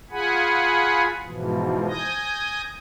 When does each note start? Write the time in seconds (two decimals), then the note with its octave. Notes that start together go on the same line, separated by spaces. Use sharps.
0.11 F4 G#4 F#5 G#5 B5
1.24 G#2 B2 E3 F3
1.89 G#5 D#6 G6 A#6